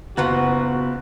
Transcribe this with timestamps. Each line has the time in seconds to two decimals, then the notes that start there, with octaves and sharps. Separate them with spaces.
0.17 F#1 B3 F4 F#4 F#5 A#5